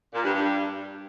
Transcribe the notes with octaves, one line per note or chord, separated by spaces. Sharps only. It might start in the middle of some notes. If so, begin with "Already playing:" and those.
A#2
G2
G2